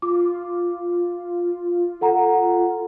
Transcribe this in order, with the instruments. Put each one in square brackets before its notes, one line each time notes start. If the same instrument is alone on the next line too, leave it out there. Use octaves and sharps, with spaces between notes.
[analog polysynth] F4 [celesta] D6
[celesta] A4 F#5 A#5